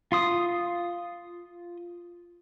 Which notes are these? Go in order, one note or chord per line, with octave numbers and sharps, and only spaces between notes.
F4 C6 D#6